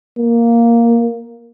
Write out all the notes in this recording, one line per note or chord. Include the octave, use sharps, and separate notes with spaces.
A#3